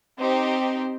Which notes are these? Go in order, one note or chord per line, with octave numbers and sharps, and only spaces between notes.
C4 D#4 G4 C5